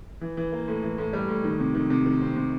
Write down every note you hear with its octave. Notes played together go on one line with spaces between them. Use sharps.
E3
E3
A#3
A2
E3
A2
G3
A2
D#3
C3
D#3
C3
D#3
C4
C3